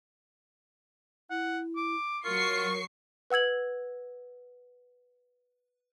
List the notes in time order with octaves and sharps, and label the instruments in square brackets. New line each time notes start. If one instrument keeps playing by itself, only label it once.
[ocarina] E4 [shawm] F#5
[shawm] D6
[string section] F#3 C#6 C7 [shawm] F4 [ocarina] A#4
[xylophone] B4 F#5 E6 G#6 F#7